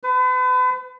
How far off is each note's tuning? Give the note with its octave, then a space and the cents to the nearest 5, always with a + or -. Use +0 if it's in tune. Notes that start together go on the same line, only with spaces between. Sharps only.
B4 +40